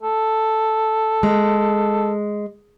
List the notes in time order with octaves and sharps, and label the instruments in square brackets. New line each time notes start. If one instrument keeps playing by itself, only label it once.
[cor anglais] A4
[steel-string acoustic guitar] G#3